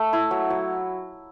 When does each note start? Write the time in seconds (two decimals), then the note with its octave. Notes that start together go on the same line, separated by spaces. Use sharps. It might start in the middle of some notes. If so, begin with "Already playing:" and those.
Already playing: A3
0.13 E4
0.31 F#3
0.50 F#3